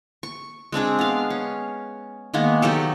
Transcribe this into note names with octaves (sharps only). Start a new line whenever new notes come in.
C#6
G#3 C4 D4 G#4
B3 F5
C#4
D#3 G#3 A#3 B3
F#3 D#4 G4 A4